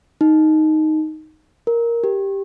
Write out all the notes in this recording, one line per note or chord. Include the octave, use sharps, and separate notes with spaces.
D#4
A#4
G4